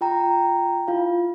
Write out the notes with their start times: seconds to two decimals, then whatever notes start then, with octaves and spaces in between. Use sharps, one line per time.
0.01 F4 G5 A#5
0.88 E4 F4 F5